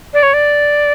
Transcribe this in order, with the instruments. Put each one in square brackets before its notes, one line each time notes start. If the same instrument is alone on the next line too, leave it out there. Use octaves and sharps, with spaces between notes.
[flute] D5
C#5
D5